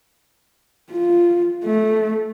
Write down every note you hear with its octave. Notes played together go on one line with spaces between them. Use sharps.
F4
A3